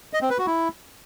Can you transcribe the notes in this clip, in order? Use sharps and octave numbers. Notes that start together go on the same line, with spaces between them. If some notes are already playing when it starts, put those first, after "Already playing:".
D#5
C4
B4
F#4
E4